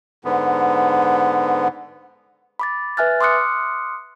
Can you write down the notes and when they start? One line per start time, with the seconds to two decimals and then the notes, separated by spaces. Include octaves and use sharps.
0.25 G#2 D3 B3
2.59 B5 D6 A6
2.97 B4 E5 G#5 F6 F#6 A6
3.21 C6 D6 D#6 F6 F#6 C#7